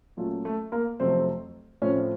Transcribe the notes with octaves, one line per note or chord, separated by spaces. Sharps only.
A#2 F#3 A3 C#4 F4
A3 A4
A#3 A#4
F2 C3 F#3 A3 C4 C5
A2 F3 C4 C#4 C#5